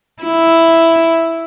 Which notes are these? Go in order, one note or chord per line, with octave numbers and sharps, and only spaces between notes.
E4